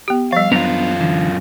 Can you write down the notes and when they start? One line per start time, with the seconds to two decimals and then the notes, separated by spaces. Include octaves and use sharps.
0.08 B3 G4
0.33 F3 G3 F5
0.52 F#2 B3 D4 F4 A#5
1.00 D3 E3